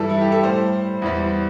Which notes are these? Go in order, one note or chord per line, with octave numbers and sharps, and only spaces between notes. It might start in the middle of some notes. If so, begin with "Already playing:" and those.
Already playing: G2 E3 G3 A4
E4
G4
A4
A2 G3 C5
E2 E3 G3